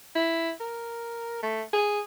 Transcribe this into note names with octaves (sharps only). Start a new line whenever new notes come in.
E4
A#4
A3
G#4